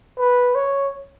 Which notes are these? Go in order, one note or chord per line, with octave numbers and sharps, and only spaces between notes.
B4
C#5